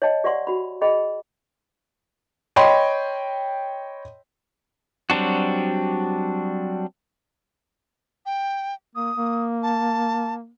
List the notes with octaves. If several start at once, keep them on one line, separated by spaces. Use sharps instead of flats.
C#5 D#5 G5 A5
G4 D5 E5 F#5 C6 C#6
F#4 B5
G#4 D#5 G5 B5
C#5 D#5 G5 B5 C6
F#3 G3 C4 D4 F#4
G5
A#3 D#6
A#3
A5